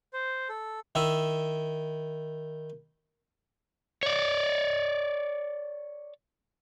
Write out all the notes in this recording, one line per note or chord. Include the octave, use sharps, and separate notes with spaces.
C5
A4
D#3 E4
C#5 D5